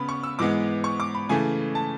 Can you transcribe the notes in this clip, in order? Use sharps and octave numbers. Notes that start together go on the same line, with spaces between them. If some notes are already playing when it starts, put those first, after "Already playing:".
Already playing: C#3 B3 B5
C#6
E6
G#2 E3 G#3 B3 D6
C#6
D6
B5
C#3 E3 A3 G#5
A5